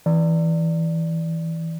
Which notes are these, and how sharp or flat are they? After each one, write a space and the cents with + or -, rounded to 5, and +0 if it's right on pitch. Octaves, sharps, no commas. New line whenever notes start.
E3 -15 D5 +0